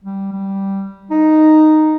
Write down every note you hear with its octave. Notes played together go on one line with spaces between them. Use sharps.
G3
G3
D#4